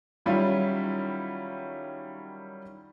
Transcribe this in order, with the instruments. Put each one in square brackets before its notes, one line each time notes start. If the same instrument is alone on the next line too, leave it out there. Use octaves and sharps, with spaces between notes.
[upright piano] D#3 F#3 G3 C#4 E4 F4